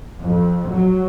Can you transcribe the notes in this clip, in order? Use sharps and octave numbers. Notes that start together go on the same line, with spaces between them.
F2
F#3